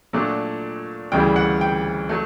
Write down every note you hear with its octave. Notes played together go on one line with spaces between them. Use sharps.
A#2 F#3 A3 D4
D2 C#3 E3 G3 G5
F#5
G5
F#3 A3